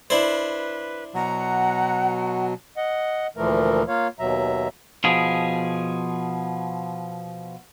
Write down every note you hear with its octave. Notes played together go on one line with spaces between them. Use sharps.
D4 E4 B4 C5
B2 F#3 F#5 A#5
D#5 F#5
D2 A#2 E3 F3 A3 A#4
A#3 F4 C#5 F5
D#2 B2 F#3 E5 A#5
B2 F3 G#4